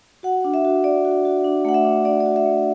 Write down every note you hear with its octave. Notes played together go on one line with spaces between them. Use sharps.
F#4 F#5
D4
E5
F#4
D4 D5
F#4
F#4
D4
A3 F#5
E5
D4
D4 D5
D5
F#4
E5
A3